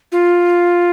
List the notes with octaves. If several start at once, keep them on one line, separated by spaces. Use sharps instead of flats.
F4